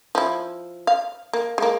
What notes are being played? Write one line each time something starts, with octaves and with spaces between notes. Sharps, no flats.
F3 E4
F5
A#3
G#3 A#3